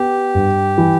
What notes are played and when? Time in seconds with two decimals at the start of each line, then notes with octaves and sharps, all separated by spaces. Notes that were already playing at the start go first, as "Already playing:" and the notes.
Already playing: B3 G4
0.35 G2
0.78 E3